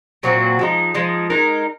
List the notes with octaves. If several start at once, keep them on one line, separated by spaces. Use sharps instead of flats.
A#2 F#3 C4 F#4
F3 G#3 D#4
F3 G#3 D#4
G#3 D#4 A#4